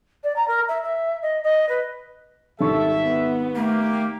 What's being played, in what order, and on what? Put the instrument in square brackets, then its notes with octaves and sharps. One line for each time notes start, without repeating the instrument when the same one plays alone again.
[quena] D5
A#5
A#4
E5
E5
D#5
D#5
B4
[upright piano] G#1 G3 C#6 [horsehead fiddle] A4 [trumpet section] E5
[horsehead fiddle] B3
[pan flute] A3 [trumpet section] A#3 G4